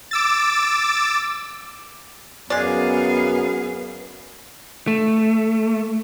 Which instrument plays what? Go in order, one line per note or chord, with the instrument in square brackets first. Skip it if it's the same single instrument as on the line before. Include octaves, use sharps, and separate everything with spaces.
[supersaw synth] D6 E6 A6
[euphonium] F#2 [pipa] G#3 D5 [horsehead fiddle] B3 [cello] G#4 F5
[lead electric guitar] A3